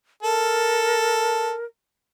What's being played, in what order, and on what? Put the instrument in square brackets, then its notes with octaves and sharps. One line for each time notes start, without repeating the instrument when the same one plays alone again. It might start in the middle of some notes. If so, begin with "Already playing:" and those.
[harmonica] A4 [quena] A#4